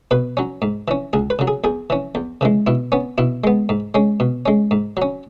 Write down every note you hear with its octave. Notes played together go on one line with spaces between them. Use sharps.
B2 B4
F#3 C#4
G#2
E3 C#4
C#2 G#4
B4
C#3 F#3
G#4
E2 G#4
E3 C#4
E2
C#3 E3 G#3
B2 E4
B3 C#4
B2 E4
G#3 B3
G#2
G#3 C#4
B2
G#3 C#4
G#2
F#3 C#4